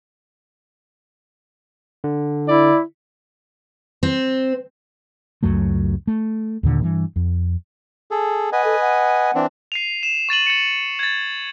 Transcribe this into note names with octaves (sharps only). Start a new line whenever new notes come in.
D3
E4 D5
C4
C#2 F#2 F#3 A3
A3
D#2 A#2 D3
G2 E3
F2
G#4 A4
B4 D#5 F#5 G#5
A4
F#5
E3 C4 D4
C7 D#7 F7
E7
C#6 A6 D#7 F#7
A6 C#7
G#6 A6